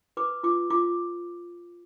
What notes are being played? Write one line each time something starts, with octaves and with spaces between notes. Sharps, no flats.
B4 D6
F4 D6
F4 D6